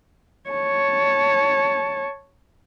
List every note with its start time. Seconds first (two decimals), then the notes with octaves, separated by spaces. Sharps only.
0.50 C#5 A5